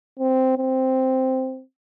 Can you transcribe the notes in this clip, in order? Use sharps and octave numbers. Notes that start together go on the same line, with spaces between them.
C4
C4